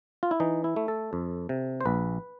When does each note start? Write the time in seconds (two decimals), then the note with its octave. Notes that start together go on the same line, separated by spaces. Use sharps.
0.23 F4
0.31 E4
0.40 E3 D#4
0.64 E4
0.76 A3
0.88 A4
1.13 F2
1.49 C3
1.81 C5
1.86 A#1 B4